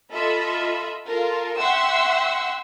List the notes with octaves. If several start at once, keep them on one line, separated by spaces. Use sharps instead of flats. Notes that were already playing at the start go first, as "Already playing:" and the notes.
F4 A4 D#5 E5 B5
F4 A4 A#4
E5 F#5 G5 C6 C#6 E6